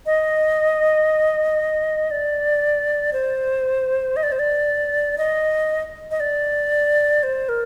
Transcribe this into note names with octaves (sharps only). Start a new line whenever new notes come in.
D#5
D5
C5
D#5
D5
C5
D5
D#5
D#5
D5
C5
A#4